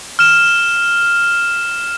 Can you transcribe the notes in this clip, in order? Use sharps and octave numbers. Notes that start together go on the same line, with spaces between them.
F6 E7